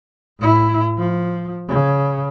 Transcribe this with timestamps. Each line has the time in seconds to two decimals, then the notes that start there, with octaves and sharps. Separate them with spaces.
0.39 A2 E4
0.98 F3
1.68 C#3